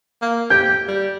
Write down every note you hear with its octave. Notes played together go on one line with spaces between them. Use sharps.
A#3
G4 G6
G3